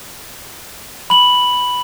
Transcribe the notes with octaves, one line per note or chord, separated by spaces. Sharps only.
B5 F#7